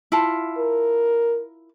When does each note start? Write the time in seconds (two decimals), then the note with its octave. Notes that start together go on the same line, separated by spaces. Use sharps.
0.12 E4 F4 A5
0.59 A#4